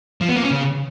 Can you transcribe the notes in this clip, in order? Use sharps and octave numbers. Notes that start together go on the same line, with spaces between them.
F3
B3
A#3
C#4
C#3